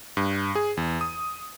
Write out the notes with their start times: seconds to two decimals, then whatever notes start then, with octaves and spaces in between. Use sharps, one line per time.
0.17 G2
0.55 G#4
0.77 E2
1.01 D#6